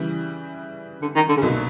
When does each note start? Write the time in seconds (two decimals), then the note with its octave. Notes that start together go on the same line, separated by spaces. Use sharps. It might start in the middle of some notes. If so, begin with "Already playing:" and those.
Already playing: C#3 E3 G3
1.02 D3
1.16 D#3
1.29 D3
1.37 C#3
1.42 C2 B2 D3 F#3 A#3 D#4